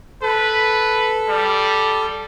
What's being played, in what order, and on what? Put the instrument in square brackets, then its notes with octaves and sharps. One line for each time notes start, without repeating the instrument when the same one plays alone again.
[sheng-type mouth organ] A4 [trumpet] B4
[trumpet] G3